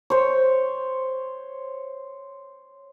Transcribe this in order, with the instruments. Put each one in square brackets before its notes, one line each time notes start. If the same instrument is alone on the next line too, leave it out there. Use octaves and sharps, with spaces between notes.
[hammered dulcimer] C5 C#5